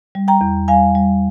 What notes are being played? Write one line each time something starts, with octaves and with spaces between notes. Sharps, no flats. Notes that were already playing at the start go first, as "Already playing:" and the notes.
G3
G5 A#5
E2
G3 F5 G#5
G3